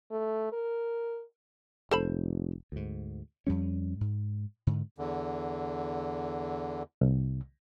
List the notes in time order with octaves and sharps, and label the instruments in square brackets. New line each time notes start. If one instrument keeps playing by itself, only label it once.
[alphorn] A3
A#4
[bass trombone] F1 [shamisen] A4 C5 B5
[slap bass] D2 G#2
F2 G3 C#4
G#2
G#2 D3
[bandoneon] E2 D3
[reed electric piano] C2